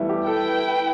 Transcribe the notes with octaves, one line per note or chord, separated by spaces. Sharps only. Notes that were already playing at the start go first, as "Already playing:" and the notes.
Already playing: E3 G3 A3 B3 E4
G4
E4 A4 B4 G5